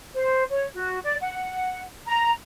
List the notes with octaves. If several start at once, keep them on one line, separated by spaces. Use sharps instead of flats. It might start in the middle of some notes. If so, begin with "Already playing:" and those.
C5
C#5
F#4
D5
F#5
A#5